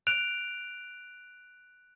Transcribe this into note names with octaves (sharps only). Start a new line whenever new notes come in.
F#6 D7 F7